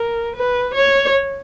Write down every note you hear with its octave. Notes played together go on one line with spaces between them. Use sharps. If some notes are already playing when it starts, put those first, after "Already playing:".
Already playing: A#4
B4
C#5